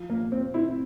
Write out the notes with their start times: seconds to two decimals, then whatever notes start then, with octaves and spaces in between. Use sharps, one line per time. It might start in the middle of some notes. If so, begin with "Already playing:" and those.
Already playing: F3
0.09 A#2 A#3
0.32 A#2 C4
0.54 C4 E4